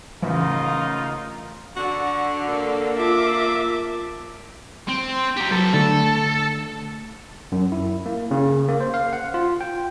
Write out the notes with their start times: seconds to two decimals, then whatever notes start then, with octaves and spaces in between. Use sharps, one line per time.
0.22 A1 C#3 E3 A#3 D#4 F4
1.76 D3 F#4
2.49 A#3 A4
2.98 F4 E5 A5 D6
4.89 C4
5.37 F#3 G4
5.51 F#3 A4 B4
5.74 D3 A3 A4
7.52 F#2
7.72 E4
8.06 A#3
8.31 C#3
8.69 A#3
8.81 C5
8.94 F5
9.13 F#5
9.34 F4
9.61 G5